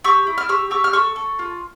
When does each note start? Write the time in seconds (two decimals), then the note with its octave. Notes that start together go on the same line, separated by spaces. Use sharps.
0.04 G4 C#6 E6
0.27 E4
0.38 F6
0.48 G4 C#6 E6
0.70 G4 C#6 E6
0.84 F6
0.93 A4 C#6 E6
1.16 A4
1.39 F4